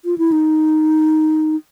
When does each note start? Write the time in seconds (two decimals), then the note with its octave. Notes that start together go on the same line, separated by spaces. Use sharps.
0.05 F4
0.18 E4
0.32 D#4